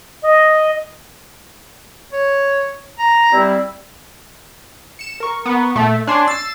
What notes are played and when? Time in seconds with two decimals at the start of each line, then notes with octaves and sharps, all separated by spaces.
0.24 D#5
2.13 C#5
2.99 A#5
3.33 G3 C4 E4
4.99 C#7 E7
5.20 A#4 C#6
5.45 B3
5.76 A#2 A3
6.07 D4 C#5 G#5 C6
6.28 E6 A6 C7